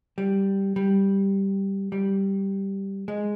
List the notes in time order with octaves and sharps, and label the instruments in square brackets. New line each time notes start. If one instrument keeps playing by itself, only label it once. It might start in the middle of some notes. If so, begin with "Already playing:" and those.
[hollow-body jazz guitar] G3
G3
G3
G#3